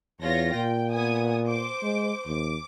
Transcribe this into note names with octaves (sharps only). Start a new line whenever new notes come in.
E2 F4 C#5 A#6
A#2 G5
B3 G#5 D#6
C5 D6
G#3
D#2 D6